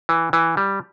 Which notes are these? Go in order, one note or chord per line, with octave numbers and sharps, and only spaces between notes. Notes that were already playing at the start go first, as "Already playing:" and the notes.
E3
E3
G3